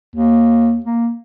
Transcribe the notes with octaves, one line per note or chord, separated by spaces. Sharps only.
D#2
A#3